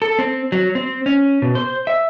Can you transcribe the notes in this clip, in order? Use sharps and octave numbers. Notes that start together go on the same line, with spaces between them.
A4
C4
F#3
C4
C#4
B2
C5
E5